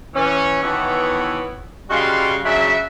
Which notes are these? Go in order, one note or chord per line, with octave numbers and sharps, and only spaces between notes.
E3 C#4
B2 D#3 E3 B3 E4 C#5
C#3 G3 F#4 D#5 F5 C6
C#3 F#3 D4 E5